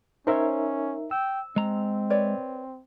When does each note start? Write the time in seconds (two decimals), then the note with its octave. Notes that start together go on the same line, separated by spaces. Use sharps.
0.27 C#4 D#4 A#4 C5 C#5 E5
1.11 G5 E6
1.56 G#3 C4 A#5
2.10 B4 C#5 D5